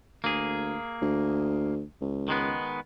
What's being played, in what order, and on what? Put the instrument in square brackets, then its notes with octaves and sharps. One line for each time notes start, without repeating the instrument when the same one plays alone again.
[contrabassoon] D2 [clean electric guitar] A#3 G#4
[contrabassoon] D2
C#2
[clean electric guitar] D#3 G#3 B3